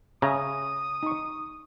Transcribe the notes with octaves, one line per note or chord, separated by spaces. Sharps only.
C#3 E5 G#5 A#5 D#6
D#4 C#6